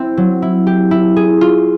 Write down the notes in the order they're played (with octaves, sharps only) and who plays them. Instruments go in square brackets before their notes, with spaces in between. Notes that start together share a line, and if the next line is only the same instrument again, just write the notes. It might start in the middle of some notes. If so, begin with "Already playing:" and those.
Already playing: [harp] C4 E4
F#3
E4
G4
E4
G#4
F4